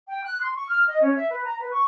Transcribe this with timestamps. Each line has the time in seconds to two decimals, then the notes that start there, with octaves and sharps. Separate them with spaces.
0.09 G5
0.24 F#6
0.41 C6
0.55 C#6
0.70 F6
0.88 D#5
1.01 C#4
1.15 E5
1.30 B4
1.45 A#5
1.59 B4
1.71 C#6